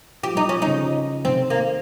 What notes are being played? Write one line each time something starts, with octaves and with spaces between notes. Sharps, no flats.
F3 G4
G3 D#4
F3 C#4
G3
C#3 F3 D#4
C3 D#3 C4
A#3